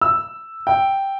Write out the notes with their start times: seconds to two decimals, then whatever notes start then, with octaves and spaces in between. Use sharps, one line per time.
0.01 E6
0.67 G5